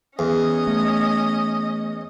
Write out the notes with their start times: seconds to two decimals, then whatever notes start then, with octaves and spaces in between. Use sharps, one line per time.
0.19 E2 C#4 D#5
0.67 A3